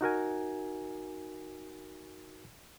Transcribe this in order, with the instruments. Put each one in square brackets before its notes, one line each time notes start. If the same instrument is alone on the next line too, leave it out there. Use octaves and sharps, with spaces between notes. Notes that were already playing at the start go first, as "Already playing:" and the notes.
[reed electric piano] D#4 F#4 A#4 G#5